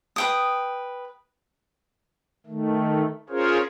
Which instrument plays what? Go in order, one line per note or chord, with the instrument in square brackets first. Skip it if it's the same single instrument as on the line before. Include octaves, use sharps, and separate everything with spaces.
[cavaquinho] B4 G5 D#6
[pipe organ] D#3 A3
C#4 F4 G#4 A#4 C5 C#5